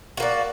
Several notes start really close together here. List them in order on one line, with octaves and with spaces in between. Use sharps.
F#4 A#3 D5